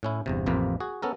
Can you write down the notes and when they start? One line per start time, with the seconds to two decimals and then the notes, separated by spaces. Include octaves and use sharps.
0.03 A2 C#4 E4
0.26 G1 E2 C3
0.46 A1 F2 C3 A#3 F4 B4
0.80 F#4 G#4
1.02 B3 C#4 A4 A#4